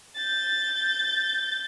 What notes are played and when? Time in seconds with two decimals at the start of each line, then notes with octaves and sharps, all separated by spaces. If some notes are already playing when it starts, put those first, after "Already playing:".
0.16 G6 A6